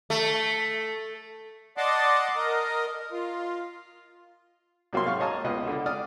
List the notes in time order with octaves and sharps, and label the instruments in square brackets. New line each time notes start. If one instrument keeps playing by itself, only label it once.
[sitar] A3
[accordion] D5 D#5 F#5 A5 C6 D6
A#4 D#5
F4
[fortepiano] C2 F#3 A#3 E5 C6
G#2 F5 C#6
C#5 D#5 A5 A#5 D#6
C#2 B2 F4 B4 D#5
D3
D5 D#6 F6